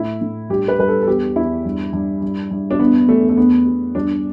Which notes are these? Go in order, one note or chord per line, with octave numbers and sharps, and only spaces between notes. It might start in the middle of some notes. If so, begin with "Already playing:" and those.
Already playing: A2 E4
A2
G2 G4
B4
G2 B4
A4
A4
E2 G4
E2 E4
G2
G2
G2
G2
D4
E2 B3
E2 A3
A3
E2 B3
E2
G2 D4